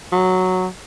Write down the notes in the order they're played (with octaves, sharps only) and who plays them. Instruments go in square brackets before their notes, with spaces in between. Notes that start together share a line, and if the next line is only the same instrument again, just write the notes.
[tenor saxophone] F#3